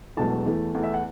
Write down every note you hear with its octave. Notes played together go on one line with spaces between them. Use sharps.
E1 E2 B2 F#3 A3 A5
E2 E3 A3
E2 E3 A3
E5
F#5